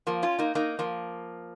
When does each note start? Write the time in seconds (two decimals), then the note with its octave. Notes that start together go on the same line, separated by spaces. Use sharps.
0.07 F3 A#3
0.22 C#4 F4
0.39 A#3 D#4
0.55 A#3 D#4
0.79 F3 A#3